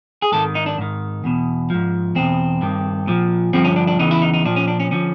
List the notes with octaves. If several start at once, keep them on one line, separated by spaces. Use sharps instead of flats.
G#4
G#2 D#3 A4
D#4
D4
G#2 D#3
E2 B2
G#2 F3
E2 B2 C4
G2 D#3
A#2 F3
G2 D3 F3 C4
C#4
D4
D4
E2 C#3 E3 D#4
E4
D#4
D#4
A#2 F3 D4
C#4
D4
C#4
D3 F3 C#4